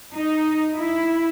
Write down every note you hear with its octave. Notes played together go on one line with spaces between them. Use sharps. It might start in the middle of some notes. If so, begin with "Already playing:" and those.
D#4
E4